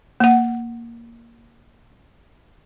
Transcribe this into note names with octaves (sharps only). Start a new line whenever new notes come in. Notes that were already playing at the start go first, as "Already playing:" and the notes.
A#3 F#5